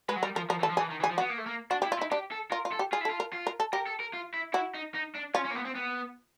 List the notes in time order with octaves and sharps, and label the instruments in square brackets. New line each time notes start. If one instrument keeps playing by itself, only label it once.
[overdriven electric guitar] G#3 [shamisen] B4
[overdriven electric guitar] F#3
[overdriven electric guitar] G3 [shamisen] A#4
[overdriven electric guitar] F3 [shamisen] A#4
[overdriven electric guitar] F3 [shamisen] A#4
[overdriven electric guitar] E3
[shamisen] A4
[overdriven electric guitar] F3
[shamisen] G#4
[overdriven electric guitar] E3
D#3
E3
[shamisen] G#4
[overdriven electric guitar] F3
[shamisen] F#4
[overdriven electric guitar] B3
A#3
A3
A#3
[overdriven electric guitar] D4 [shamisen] F#4
[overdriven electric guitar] E4 [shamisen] G4
[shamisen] F4
[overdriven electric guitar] E4
[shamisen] D#4
[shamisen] D4 [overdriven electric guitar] G4
[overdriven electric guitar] A4
[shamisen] F4 [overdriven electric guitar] A#4
[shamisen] F4
[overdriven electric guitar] A4
[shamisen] G4
[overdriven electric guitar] F4 [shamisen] G#4
[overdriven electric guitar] E4
[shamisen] A4
[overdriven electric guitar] F4
[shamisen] A#4
[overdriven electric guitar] F4
[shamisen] A#4
A4
[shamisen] G4 [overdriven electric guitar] A#4
[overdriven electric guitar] A4
A#4
F4
E4
[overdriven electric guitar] E4 [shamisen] F#4
[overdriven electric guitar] D#4
D#4
D4
[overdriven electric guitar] C#4 [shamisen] F4
[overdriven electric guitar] C#4
A#3
B3
C4
B3